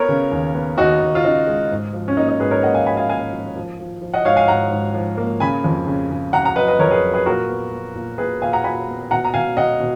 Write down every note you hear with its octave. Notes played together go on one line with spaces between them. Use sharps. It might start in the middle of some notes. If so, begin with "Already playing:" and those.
Already playing: B3 A#4 C#5
C#3
D#2
B3
D#2 D#4 F#4
D#2
F4
C#3 D#4
G#3
G#2
F3
C#4
A#3 D#4
D#4
G#2 G#4 B4
A#4 C#5
A#3 D#5 F#5
F5 G#5
F3 G#5 B5
F5 G#5
A#3 F5 G#5
F3
F3
F3
F3
D#5 F#5
G#2 C#5 F5
F5 G#5
G#2 F#5 A#5
G#2
F3
A#3
C#3 G#5 B5
F2
C#3
C#3
C#3 F#5 A#5
F#5 A#5
F#3 B4 D#5
B4 D#5
F2 A#4 C#5
G#4 B4
F#3
G#4 B4
A#2 F#4 A#4
B3
B3
A#2
A#2 G#4 B4
A#2 F5 G#5
F#5 A#5
A#2 G#5 B5
B3
B2 F#5 A#5
A#5
B2 F5 G#5
B2 D#5 F#5
B2